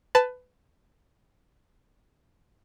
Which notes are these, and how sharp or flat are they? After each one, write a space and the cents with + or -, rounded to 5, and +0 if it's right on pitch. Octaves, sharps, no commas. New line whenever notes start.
B4 +20 A5 +0